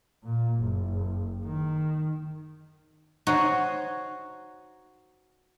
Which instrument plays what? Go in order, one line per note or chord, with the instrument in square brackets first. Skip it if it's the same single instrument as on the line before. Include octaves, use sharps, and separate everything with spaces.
[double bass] A#2
F#1
D#3
[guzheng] D#4 F#4 C5 C#5